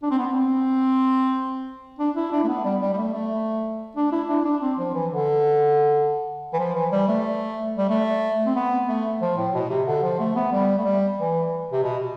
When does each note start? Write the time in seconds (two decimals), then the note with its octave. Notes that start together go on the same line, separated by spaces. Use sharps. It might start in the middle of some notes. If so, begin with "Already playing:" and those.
0.03 D4
0.11 C4
0.19 B3
0.27 C4
1.99 D4
2.16 E4
2.32 D4
2.43 A3
2.48 B3
2.65 G3
2.82 G3
2.93 G3
2.98 A3
3.14 A3
3.96 D4
4.12 E4
4.29 D4
4.45 D4
4.62 C4
4.78 F3
4.94 E3
5.11 D3
6.53 E3
6.59 F3
6.75 E3
6.92 G3
7.08 A3
7.78 G3
7.90 A3
8.46 C4
8.55 B3
8.88 A3
9.21 F3
9.37 A2
9.54 B2
9.70 C3
9.87 D3
10.03 F3
10.19 A3
10.36 B3
10.52 G3
10.78 A3
10.85 G3
11.18 E3
11.72 C3
11.83 B2